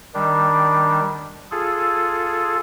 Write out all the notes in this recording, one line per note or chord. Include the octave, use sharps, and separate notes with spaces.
D#3 G3 D4
F4 G#4 A4